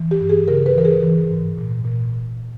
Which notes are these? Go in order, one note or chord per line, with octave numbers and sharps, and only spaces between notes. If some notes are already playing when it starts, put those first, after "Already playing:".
Already playing: E3
G4
G2
G#4
C#3 A#4
B4
E3 A#4
G#4
E3
G#2
A#2
A#2